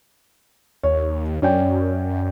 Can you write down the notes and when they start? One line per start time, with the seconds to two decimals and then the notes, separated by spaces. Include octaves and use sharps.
0.83 D#2 C#5
1.42 F#2 C#4 D5 G5